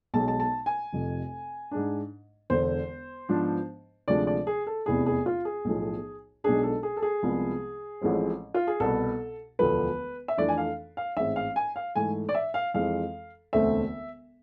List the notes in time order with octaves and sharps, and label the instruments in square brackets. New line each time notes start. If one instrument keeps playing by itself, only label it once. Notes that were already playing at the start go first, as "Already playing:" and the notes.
[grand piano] B1 B2 G#3 A5
A5
A5
G#5
F1 F2 C3
G#2 G#3 D4
E1 E2 D3 C5
G#2 F3 B3 D4
D2 C3 F3 G#3 D4 D5
D5
G#4
A4
F1 E2 C3 E3 B3 G#4
G#4
F4
G#4
B1 A2 F3
B1 B2 G#3 B3 D4 G#4
A4
G#4
A4
G#4
C2 C3 F3 G#3 B3
A1 A2 F3 G#3 C4
F4
G#4
C2 B2 B3 A4
E1 D2 D3 F3 A3 B4
E5
F2 E3 A3 D4 D5
G#5
F5
F5
A1 G#2 G#3 C4 E5
F5
G#5
F5
G#2 E3 A3 G#5
D5
E5
F5
F2 E3 G#3 C4 F5
E1 D2 D3 A3 C4 E5